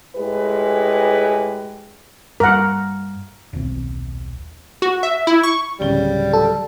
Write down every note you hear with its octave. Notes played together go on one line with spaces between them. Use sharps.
A2 G#3 G4 G#4 B4
G2 A#4 F#5
D#1 B1 C4
F#4
E5
E4
C#6
D1 C#3 G3 G7
A4